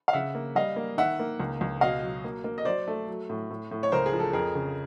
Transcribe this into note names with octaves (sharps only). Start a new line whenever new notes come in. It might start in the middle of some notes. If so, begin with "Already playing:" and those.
F5
C#3 E5 F#5
A#3
G3 D#5 F5
A#3
D#3 E5 F#5
A#3
C#2
C#2
B2 D#5 F5
F#3
A#3
A#3
D#5
F#3 C5 D5
A3
F#3
A2
A2
A2
C#5
C#2 A#4 C5
G#4
F3
A4
F2 G#4 A#4
C#3